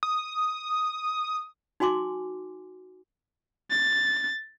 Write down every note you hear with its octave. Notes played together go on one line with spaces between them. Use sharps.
D#6
D#4 F#4 G#5 C6 D6
A6